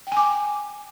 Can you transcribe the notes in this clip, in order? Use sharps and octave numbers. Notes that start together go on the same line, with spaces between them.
G5 G#5 D6